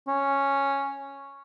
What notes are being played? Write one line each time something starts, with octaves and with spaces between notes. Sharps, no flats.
C#4